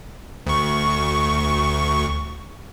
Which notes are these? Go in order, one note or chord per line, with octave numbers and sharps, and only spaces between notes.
D2 C#6